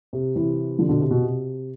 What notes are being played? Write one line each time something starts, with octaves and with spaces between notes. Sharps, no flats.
C3
C3 E3
D3 F3
B2 D3
C3
B2
C3